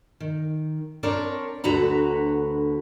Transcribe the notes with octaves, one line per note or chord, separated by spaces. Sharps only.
D#3
C4 D4 A#4 C#5
D2 D3 F#4 B4 A#5